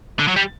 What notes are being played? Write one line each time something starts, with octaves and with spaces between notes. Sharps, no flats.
D3
F#3
G3